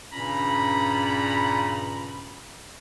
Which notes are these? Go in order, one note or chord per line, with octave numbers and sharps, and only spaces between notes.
G2 A#2 C#3 C#4 A#5 B5